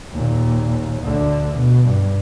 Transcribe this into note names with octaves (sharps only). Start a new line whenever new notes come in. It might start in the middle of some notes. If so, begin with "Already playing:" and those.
D#2 A#2
D2 D3
B2
G2